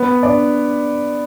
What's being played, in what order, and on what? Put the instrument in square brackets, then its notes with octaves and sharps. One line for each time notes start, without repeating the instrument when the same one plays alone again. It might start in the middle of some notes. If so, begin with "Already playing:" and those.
Already playing: [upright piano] B3 B4
D4 D5